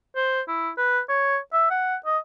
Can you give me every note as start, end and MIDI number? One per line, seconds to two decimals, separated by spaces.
0.16 0.41 72
0.48 0.70 64
0.77 1.00 71
1.09 1.38 73
1.53 1.67 76
1.70 1.95 78
2.06 2.18 75